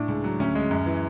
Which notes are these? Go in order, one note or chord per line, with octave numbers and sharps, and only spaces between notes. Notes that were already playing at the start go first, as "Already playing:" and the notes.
Already playing: A2 D4
C#2
F#3
D2 C#4
G#3
F#2
E3